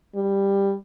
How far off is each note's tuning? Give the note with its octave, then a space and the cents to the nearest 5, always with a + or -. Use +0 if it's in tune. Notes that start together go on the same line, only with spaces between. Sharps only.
G3 +10